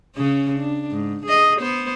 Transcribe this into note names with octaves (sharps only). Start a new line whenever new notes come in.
C#3 C#4
D4
G#2
G#4 D#5
B3 C5